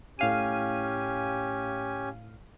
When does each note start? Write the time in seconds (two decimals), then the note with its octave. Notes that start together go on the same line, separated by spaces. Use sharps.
0.19 A2 C#4 G4 F5 G#5 D#7